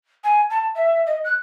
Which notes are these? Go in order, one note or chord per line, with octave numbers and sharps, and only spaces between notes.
G#5
A5
E5
D#5
F#6